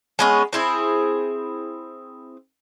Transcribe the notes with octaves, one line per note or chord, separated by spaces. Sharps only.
G#3 B3 C#4
C4 E4 G#4